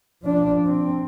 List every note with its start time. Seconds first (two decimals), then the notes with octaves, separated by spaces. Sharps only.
0.22 F3 D4
0.66 C4